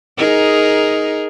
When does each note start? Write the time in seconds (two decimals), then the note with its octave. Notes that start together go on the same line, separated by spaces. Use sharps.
0.18 D#4 G#4 A#4